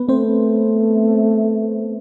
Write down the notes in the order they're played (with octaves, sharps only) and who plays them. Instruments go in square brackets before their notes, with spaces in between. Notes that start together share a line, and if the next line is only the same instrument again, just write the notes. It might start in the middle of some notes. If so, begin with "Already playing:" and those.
Already playing: [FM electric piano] B3 B4
[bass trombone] A3 [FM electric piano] C4 C5